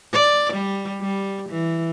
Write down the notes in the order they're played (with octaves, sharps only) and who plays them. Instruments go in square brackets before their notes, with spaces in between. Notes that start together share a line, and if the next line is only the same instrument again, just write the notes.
[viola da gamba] D5
G3
G3
E3